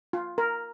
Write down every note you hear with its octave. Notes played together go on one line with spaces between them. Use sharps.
F4
A#4